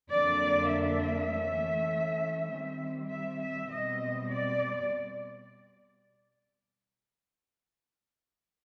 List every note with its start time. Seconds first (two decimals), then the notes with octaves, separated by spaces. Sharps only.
0.11 F2 D3 F#3 A#3 D4 D5
0.71 E5
1.31 E3 A3 C#4
2.51 D#3 G3 C4
3.11 E5
3.41 E5
3.71 B2 G3 C4 D#5
4.31 D5